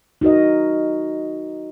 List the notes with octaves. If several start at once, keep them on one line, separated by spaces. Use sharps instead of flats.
D#4 F#4 A#4 D#5